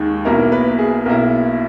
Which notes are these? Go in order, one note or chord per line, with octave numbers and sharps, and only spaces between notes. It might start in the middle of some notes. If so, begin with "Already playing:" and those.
Already playing: D#2 D#3 G#3
B1 B2 A#3 E4 A#4
B4
G#4
B1 B2 A#3 E4 A#4